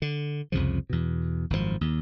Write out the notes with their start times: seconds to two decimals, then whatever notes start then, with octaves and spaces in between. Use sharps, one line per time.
0.02 D3
0.52 C2 F2 C#3 F3
0.90 E2 B2
1.50 G#1 F#2 A2 F3
1.81 D#2